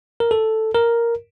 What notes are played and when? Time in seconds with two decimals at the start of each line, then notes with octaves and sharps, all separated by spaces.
0.20 A#4
0.31 A4
0.74 A#4